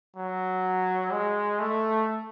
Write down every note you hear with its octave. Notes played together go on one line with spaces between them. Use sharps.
F#3
G#3
A3